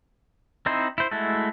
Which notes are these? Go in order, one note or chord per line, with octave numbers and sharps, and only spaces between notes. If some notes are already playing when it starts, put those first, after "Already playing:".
C4 D#4 E4 C5
E4 C5
G#3 A3 E4 F#4 A4